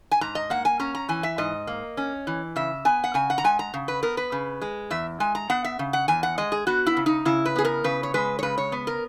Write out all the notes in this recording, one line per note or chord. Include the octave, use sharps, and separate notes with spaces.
G#5
G#2 A#5
D#5
A#3 F#5
G#5
C#4 A#5
A#5
E3 G#5
E5
G#2 D#5
A#3
C#4
E3
C#3 E5
B3 G#5
F#5
C#3 G#5
F#5
A#5
G#3 G#5
A#5
C#3
B4
B3 A#4
B4
C#3
G#3
E2 E5
G#3 G#5
A#5
B3 F#5
E5
C#3
F#5
E2 G#5
F#5
G#3 D#5
G#4
B3 F#4
E4
C#3
D#4
C#3 E4
B4
B3 G#4
A#4
C#3 B4
C#5
G#3 B4
C#5
C#3 B4
C#5
B3
A#4